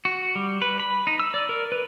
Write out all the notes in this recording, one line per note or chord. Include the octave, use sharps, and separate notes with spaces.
F#4
G3
B4
B5
D#4
E6
D5
A#4
B4